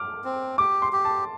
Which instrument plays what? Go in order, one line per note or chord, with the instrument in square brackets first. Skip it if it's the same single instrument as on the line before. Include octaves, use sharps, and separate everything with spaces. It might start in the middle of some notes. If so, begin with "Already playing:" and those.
Already playing: [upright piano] D6 F6
[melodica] C4
[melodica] G4 [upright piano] D6
[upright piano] C6
[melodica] G4
[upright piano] A5